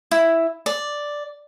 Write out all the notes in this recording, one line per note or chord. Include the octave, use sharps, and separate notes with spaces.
E4
D5